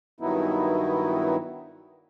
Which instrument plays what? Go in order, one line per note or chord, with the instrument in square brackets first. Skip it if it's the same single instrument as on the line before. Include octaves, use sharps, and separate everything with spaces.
[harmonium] G2 D#3 F#3 B3 D#4 E4